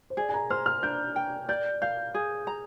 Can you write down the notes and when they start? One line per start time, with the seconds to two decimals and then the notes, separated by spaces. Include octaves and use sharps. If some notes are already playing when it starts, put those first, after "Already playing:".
0.10 C5
0.17 G#4 D5
0.29 G#5
0.34 A#5
0.50 C5 F6
0.66 F6
0.83 D4 G6
1.16 G5
1.49 D5 G6
1.82 F5 G6
2.14 G#4
2.47 A#5